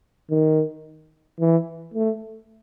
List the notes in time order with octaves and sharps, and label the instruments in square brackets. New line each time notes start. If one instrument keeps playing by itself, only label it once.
[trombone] D#3
E3
A3